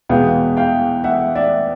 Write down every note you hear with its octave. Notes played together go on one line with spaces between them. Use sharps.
E2 B2 G#3 B3 F5 G5
F5 G5
E5 F#5
D5 E5